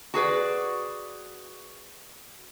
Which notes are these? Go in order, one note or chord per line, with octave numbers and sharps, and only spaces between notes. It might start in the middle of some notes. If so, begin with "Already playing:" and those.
F#4 G#4 B4 D5